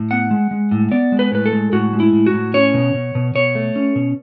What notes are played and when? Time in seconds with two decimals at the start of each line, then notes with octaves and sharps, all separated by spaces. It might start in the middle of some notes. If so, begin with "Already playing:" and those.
Already playing: A2
0.11 B3 F#5
0.31 G#3
0.51 G#3
0.71 A2
0.92 B3 D5
1.12 G#3
1.19 B4
1.32 A2 B4
1.46 A4
1.53 G#3
1.72 A2 F#4
1.93 G#3
2.00 E4
2.13 A2
2.26 F#4
2.33 A2
2.54 C#4 C#5
2.74 B2
2.94 B2
3.15 B2
3.35 B2 C#5
3.55 A3
3.76 C#4
3.96 B2